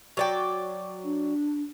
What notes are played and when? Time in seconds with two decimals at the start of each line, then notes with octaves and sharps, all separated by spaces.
0.17 F#3 D5 G5
1.04 D4